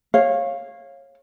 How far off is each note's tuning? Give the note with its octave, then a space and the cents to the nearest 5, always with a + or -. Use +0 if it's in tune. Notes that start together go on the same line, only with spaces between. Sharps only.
C#5 -20 F5 +0